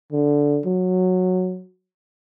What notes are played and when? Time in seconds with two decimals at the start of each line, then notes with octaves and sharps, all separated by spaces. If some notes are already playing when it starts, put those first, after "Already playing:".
0.12 D3
0.66 F#3